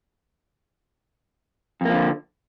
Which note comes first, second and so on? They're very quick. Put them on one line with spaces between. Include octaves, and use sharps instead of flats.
F2 A#3 F3 D3